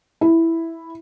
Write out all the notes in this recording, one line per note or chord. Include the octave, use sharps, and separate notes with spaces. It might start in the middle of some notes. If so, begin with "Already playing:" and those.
E4